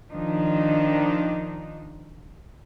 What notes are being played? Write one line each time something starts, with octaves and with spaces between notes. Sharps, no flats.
D#3 F3 D4 D#4